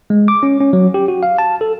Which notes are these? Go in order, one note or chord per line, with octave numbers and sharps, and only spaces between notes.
G#3
D6
C#4
C#4
F#3
G4
F#4
F5
A5
A4